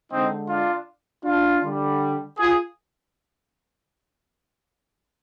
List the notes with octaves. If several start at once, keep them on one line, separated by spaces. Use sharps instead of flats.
D3 G#3 C4 D#4
D4 F4
D4 F4
D3 G3
F4 G#4